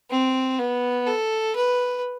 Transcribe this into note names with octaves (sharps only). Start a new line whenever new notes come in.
C4
B3
A4
B4